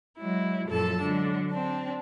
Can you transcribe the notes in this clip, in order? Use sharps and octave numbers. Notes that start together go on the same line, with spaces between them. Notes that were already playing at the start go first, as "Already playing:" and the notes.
F#3 G#3 E4
F#2 A#2 F3 A4 A5 E6
D3 F#3 G#3 D4
C4 D4